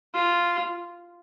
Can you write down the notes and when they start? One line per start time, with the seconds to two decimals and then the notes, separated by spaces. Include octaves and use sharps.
0.14 F4